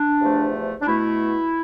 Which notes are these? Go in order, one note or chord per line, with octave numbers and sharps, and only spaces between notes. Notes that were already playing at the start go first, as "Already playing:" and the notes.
Already playing: D4
E2 C3 F3 A3
D4
B2 A3 E4